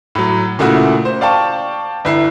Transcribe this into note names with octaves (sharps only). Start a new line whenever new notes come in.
A2 F#3
A#2 C#3 A3 E4 F#4
C5
D5 F5 G5 A5 C#6
G1 E4 C7